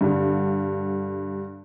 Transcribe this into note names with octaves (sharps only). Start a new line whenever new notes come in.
G2 D3